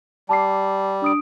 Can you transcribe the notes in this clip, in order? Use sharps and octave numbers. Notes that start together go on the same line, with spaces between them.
G3 A5 D6 C7
D4 D#6 D7